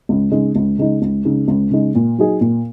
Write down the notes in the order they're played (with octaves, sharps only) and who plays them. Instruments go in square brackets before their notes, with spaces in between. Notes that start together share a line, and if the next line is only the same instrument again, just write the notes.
[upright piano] C#2
C#3 G#3 D#4
C#2
C#3 G#3 D#4
C#2
C#3 G#3 D#4
C#2
C#3 G#3 D#4
A#2
F#3 D#4 G#4
A#2